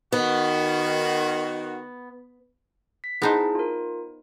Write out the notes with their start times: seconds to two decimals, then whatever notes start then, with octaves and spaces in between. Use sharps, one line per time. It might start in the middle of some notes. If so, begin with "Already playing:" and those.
0.12 D#3 B3 F#4
3.04 B6
3.22 B3 D#4 E4 G#4 C5 A5
3.55 F4 A#4